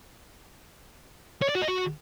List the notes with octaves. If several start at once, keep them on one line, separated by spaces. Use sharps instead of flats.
C#5
D5
F#4
D#5
F#4